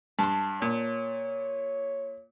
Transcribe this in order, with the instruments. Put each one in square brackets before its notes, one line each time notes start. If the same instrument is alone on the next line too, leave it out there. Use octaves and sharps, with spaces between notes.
[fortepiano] G2 [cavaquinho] A5 C6
[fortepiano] A#2 [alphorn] C#5